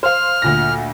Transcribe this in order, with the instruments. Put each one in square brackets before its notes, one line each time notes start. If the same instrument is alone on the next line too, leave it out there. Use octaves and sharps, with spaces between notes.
[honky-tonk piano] C5 F5 [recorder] F6
[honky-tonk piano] D2 A#2 A#6